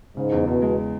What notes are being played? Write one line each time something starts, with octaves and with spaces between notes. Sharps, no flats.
G#2 C#3
E2
E2 B2
G#3